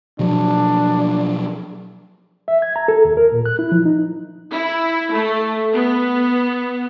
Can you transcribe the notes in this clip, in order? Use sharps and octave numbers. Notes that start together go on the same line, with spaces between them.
B2 F3 F#3 D4
E5
G#6
A#5
A4
D#2
A#4
A#2
F#6
E4
F3
D#4
E4
A3
B3